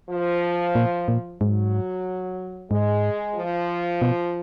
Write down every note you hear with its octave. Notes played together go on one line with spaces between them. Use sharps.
F3
A#2
A#2
G#2 F#3
G#2 G#3
F3
B2